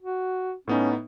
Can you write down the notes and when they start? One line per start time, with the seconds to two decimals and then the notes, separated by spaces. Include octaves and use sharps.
0.02 F#4
0.68 A2 B3 C#4 D#4